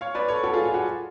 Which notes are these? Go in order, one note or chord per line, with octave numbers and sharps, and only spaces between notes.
C#5 F5
B4 D5
A4 C#5
F#4 A4
F4 G#4
F4
F#4